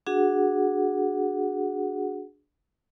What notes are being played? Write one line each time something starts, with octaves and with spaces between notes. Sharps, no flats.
D4 F#4 G#4 F#5